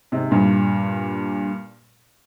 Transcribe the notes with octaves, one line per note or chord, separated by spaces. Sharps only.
G#2 C3
G2 A#2